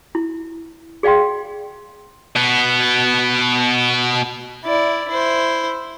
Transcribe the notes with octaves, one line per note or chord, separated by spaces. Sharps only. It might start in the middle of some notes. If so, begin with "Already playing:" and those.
E4
G#4 D5 F5 G5 C6
B2 B3
E4 D5
E4 C5